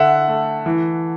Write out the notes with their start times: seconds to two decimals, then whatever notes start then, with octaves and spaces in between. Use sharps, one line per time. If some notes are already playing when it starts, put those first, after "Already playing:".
Already playing: D3 E5 F#5
0.28 A3
0.66 E3